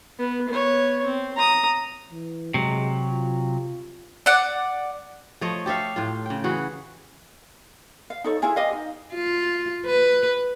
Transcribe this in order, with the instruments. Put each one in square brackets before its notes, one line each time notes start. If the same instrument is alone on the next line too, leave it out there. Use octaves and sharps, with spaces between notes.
[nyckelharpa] B3
B3 C#5
C4
A#5 D#6
[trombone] E3
[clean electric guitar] C3 F#3 [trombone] G#3
[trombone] F4
[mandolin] D5 F#5
[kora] F3 A3 C#5 D#5
G4 A4 E5 F5
A2 F4
C#3 G5
E3 F#4 G#4
[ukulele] F5
D#4 A4 C#5
E4 F4 G#4 E5
G4 D#5 F5
D#4
[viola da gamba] F4
B4